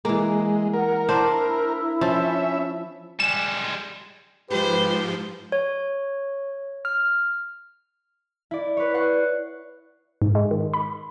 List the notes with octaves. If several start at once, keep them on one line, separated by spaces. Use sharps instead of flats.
E3 G#3 A#3
A#4 F#5
D4 E4 C5
F3 C#4 E5
G3 G#3 E7
G#2 F3 G4 B4 C5
C#5
F6
E4 D5
B4 C#5
D5 F#5 C#6 C7
G#2
G#3
D#3
B5